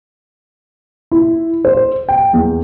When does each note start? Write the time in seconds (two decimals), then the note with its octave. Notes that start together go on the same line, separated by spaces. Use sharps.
1.11 E4
1.65 C5
2.09 G5
2.33 E2